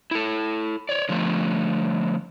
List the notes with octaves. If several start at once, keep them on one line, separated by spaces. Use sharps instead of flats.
E4 A4
C#5 D5
D3 F3 A3